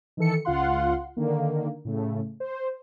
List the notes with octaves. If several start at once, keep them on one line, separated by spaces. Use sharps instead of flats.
D#3 E3 A4 C#7
C#2 F4 F5 F#5 C6
D3 D#3 A#3
A2 C#3 A3
C5